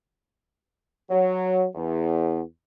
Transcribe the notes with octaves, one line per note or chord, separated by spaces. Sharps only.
F#3
E2